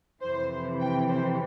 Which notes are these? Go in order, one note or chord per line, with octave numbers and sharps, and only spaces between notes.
F2 C3 E3 C5
G5
C5